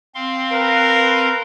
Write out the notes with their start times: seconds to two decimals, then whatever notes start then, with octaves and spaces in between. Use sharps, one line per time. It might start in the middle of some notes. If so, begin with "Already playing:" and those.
0.15 C4 F5 C6
0.52 A#4 B4